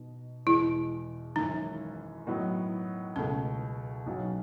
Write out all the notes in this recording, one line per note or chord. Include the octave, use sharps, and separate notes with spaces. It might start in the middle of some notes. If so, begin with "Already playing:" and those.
Already playing: B2 D#4
E2 B2 G#3 E4
G#1 F#2 E3 D#4
A2 F#3 B3 D#4
C#2 B2 A3 C#4
B1 B2 F#3 C#4 F#4